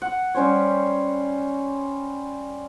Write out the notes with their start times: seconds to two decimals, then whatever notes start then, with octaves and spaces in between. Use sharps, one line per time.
0.02 F#5
0.34 G3 C#4 C5 C#5